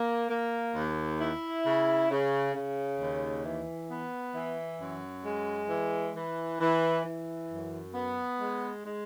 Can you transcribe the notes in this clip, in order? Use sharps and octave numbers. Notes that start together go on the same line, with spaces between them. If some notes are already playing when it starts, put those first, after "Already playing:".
Already playing: A#3
A#3
D#2
E4
C#3
C#3
C#3
D#2
E3
B3
E3
F#2
G#3
E3
E3
E3
E3
F#2
B3
G#3
G#3